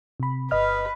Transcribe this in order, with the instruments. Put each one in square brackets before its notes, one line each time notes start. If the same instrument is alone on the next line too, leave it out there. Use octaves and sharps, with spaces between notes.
[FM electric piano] C3 B5
[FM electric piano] G1 D#5 F6 [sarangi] B4